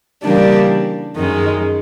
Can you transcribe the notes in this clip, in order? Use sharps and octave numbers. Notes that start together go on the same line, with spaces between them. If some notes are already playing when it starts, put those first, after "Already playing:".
C#3 E3 G3 A#3 D4
F#2 D#3 G#3